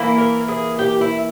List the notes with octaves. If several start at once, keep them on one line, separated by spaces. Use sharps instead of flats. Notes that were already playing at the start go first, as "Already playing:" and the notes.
Already playing: E3 A#3 E4
A#4
G#4
G4
E4